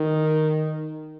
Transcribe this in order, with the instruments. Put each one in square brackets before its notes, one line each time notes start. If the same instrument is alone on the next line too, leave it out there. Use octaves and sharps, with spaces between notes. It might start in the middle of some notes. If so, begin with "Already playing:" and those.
Already playing: [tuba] D#3